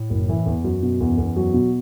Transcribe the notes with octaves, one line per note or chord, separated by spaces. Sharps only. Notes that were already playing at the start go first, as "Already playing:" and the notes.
Already playing: A2
F#1
E3
E2
F#2 F#3
B2
E2
E2
F#3
B2